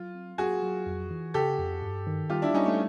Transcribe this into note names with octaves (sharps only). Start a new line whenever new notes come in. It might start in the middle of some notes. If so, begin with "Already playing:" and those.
Already playing: F#3 F4
C4
F#3 F#4 G#4
F#3
F2
E3
C#3 G4 A4
F2
G2
D#3
G3 F4 G4
D4 E4
G3 C#4 D#4
A3